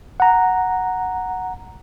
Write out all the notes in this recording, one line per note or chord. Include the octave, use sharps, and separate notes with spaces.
F#5 A#5